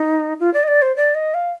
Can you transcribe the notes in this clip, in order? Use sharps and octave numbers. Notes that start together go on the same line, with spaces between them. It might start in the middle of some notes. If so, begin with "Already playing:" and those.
Already playing: D#4
F4
D5
D#5
D5
C5
D5
D#5
F5